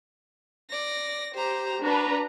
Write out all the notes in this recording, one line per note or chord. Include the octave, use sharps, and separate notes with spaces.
D5 A#6
G4 C5 A#5
D4 F#4 B4 A#5